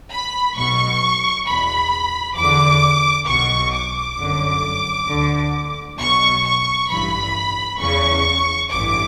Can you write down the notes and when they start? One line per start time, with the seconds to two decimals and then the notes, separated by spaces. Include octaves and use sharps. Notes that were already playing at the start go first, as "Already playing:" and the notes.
0.12 B5
0.56 B1 B2 C#6
1.47 E2 B2 B5
2.37 E2 D3 D6
3.27 B1 B2 C#6
3.73 D6
4.18 G1 F#2 D3
5.08 D2 D3
5.99 B1 B2 C#6
6.45 C#6
6.90 A1 G2 E3 B5
7.80 E2 C#3 E3 C#6
8.70 A1 G2 E3 D6